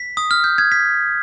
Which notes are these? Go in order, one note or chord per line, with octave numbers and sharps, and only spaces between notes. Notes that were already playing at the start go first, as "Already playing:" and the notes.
Already playing: B6
D#6
F6
G6
G#6
B6